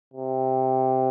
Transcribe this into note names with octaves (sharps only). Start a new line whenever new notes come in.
C3